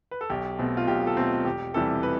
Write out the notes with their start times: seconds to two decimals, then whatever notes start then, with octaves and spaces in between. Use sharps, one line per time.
0.11 B4
0.21 A4
0.30 B1 G4
0.59 B2 A3 C4
0.77 F4
0.87 B1 G4
1.07 A4
1.17 B2 A3 C4
1.45 E1 G4
1.74 E2 C3 E3 G3 A4
2.03 B4